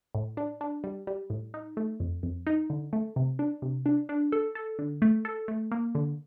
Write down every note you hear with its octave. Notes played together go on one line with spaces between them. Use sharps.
A2
D4
D4
G3
G3
A2
D#4
A3
F2
F2
D#4
D3
A3
C3
D4
C3
D4
D4
A4
A4
D3
A3
A4
A3
A#3
D3